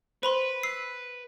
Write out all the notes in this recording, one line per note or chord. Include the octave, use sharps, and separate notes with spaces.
B4 C5 B5 C6
E6 C7